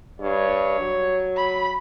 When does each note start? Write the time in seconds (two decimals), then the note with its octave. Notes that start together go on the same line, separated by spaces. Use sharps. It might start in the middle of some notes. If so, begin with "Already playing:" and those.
0.20 G2 C#5
0.80 F#3
1.36 B5